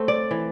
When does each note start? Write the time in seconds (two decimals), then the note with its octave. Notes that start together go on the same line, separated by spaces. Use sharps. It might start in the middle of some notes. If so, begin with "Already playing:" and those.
Already playing: A3 C4
0.08 D5
0.31 E3